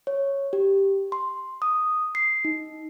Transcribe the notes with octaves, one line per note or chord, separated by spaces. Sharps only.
C#5
G4
C6
D#6
C7
D#4